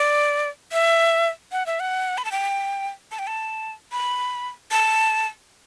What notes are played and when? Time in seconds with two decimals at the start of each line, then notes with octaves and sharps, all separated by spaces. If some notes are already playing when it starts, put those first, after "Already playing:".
Already playing: D5
0.72 E5
1.52 F#5
1.66 E5
1.80 F#5
2.18 B5
2.25 A5
2.32 G5
3.11 A5
3.19 G5
3.27 A5
3.92 B5
4.71 A5